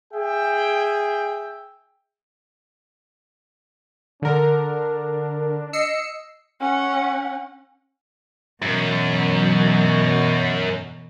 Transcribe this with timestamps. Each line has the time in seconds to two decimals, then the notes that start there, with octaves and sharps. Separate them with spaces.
0.14 G#4 E5 G5
4.22 D3 D4 A#4
5.73 D#5 E6 C7 C#7
6.61 C#4 F#5
8.62 F#2 B2 E3